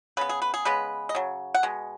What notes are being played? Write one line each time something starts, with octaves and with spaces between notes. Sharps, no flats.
C#3 B3 B4
G#4
B4
G#4
C#3 G#3 B3 B4
D#5
C#3 F#3
F#5
B2 G#3